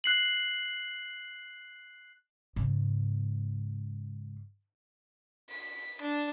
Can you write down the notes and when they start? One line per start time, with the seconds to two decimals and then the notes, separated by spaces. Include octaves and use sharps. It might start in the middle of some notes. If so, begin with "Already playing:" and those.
0.04 F#6 C7 F#7
2.56 G#2 C#3
5.50 B6
6.01 D4